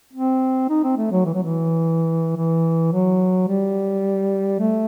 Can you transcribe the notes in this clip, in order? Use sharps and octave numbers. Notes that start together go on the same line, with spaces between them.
C4
D#4
C4
A3
F#3
E3
F#3
E3
E3
F#3
G3
A3